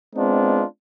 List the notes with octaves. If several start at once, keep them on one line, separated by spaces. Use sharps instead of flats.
G#3 B3 C4 D4 D#4 F4